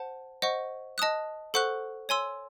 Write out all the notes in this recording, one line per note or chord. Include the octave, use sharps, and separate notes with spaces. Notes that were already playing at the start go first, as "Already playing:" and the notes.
Already playing: C5 F#5 A5
C5 D#5 F#5 C#6
D#5 A5 D#6 F#6
A4 C5 F#5 C#6 F#6
C#5 G#5 C6 E6